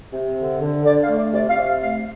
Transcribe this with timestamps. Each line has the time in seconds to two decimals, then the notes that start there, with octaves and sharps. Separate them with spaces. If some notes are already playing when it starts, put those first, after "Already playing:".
0.13 C3
0.37 D3
0.61 D3
0.85 D3 D5
1.02 F5
1.09 A3
1.17 D5
1.33 C3 D5
1.50 F5
1.57 C3
1.66 F5
1.81 A3 F5